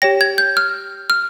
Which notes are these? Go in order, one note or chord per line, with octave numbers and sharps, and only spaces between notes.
G4 C#5 G5 A#6
G#6
G6
F6
F6